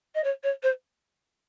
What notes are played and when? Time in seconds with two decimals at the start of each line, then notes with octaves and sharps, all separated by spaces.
0.15 D#5
0.23 C#5
0.43 C#5
0.62 C5